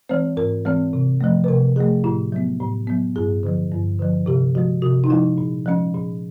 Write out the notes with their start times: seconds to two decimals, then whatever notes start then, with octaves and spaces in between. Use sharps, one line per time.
0.09 E3 G#3 C4 C5
0.37 G#2 A#4
0.65 E3 G#3 C4
0.93 C3
1.21 F3 A3
1.44 B4
1.48 C3 A#4
1.76 F3 A3 G#4
2.04 A2 E4
2.32 F#3 B3
2.60 A2
2.87 F#3 B3
3.16 G2 G#4
3.43 D3 F3
3.72 G2
3.99 D3 F3
4.26 C3 G4
4.55 F3 G#3 F#4
4.82 C3 F#4
5.04 D#4
5.10 F3 G#3 E4
5.38 A#2
5.66 F3 G#3 C#4
5.94 A#2